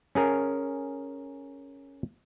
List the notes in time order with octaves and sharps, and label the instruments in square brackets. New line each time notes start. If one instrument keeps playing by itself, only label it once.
[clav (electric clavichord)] C#4 G#4 A#4